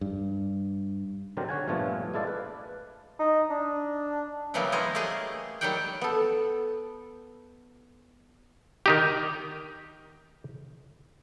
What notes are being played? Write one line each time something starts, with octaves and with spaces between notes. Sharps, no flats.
G2
B2 D3 F#3 C4 G4 A#4
D3 C#5 F#5 G#5
G2 A#2 F3 A3 B3 F4
G#3 E4 A4 D5 F5
B4
D#4
D4
C#3 E3 F#3 G3 A#3 B3
G#3 B3 E4 C5 C#5 D#5
A3 A#3 G4 G#4 D#5
D#3 F#3 G3 G4 F#5 G5
B3 A4
D#3 D#4 G4